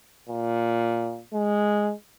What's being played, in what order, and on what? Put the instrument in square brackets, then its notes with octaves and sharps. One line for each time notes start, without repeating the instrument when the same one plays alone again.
[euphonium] A#2
G#3